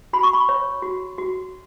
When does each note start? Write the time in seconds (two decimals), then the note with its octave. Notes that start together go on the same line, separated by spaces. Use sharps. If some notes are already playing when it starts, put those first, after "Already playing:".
0.13 F#4 B5
0.23 C#6
0.33 B5
0.49 C#5
0.82 F#4
1.18 F#4